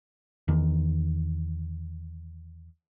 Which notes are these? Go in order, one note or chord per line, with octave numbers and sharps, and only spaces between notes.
E2 D#3